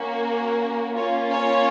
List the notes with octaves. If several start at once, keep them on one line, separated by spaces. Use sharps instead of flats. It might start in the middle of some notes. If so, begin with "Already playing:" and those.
Already playing: A#3 C#4 F#4
A#3 C#4 F4 C#5
C#5